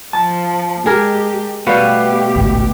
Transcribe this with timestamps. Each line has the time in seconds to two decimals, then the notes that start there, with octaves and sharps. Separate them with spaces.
0.13 F3 A5
0.86 G#3 G4 G#4 A#4
1.67 B2 G3 A3 B3 F#4 G4 B4 F5
2.36 G#1 C#2 A2